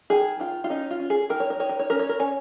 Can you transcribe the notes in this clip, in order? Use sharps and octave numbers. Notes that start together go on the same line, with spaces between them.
D#3 G#4
D#3 F4
F4
C#4 D#4
F4
C#4
G#4
D#3 A#4
C#5
A#4
D#3 C#5
A#4
C#5
C#4 A#4
C#5
A#4
C#4 C#5